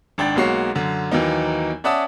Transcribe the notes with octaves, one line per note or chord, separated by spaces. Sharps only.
G#1 D4 G5 A6
B1 G#3 A#3 F#4 C#5 C7
F#2 D3
D#2 E3 F#3 A#3 D#4
C#4 D5 E5 F#5 A5 D#6